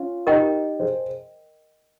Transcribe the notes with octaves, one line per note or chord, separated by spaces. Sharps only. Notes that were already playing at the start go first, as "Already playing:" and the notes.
Already playing: C#4 F4
D#4 G4 A#4 D#5 G5
G#4 C5